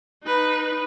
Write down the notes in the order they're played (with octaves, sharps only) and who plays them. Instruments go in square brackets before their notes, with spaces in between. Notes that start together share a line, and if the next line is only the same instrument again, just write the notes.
[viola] D#4 B4